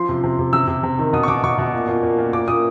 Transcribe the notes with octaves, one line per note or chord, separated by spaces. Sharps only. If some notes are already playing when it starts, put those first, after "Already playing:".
Already playing: F3 C6
C3
C3
C3
C3 E6
C3
C3
D#3
B2 D#6
C#6
B2 D6
B2 C#6
B2
A#2
A#2
A#2
A#2
A#2 D6
A#2 D#6